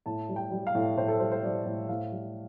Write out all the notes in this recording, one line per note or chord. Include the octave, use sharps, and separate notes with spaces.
A2 A5
G3
G5
G3
F5
A2
A2 C5
A4
G3 C5
C5
G3 D5
A2
A2 F5
G3